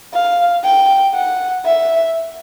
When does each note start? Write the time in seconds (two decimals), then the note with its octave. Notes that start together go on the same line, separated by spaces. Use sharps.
0.14 F5
0.64 G5
1.14 F#5
1.65 E5